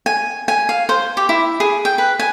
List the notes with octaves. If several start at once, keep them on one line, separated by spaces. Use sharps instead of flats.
G#5
G#5
F5
C5
G4
E4
G#4
G5
B4
G#5